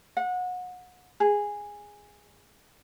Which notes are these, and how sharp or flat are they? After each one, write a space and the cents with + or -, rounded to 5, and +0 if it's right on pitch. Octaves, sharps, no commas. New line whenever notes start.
F#5 -30
G#4 -10